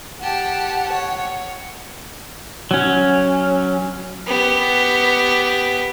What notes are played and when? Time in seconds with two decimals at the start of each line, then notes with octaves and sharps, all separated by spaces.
0.23 G4 F#5 A5
0.92 C#5
2.71 F#3 C#4
4.27 B3 G4